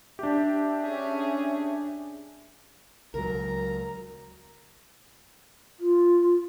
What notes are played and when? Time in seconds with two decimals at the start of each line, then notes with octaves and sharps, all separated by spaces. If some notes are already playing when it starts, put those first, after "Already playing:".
0.19 D4 G4 E5
0.82 C#4 G#4
3.14 C#2 F#3 A#4 A#5
5.80 F4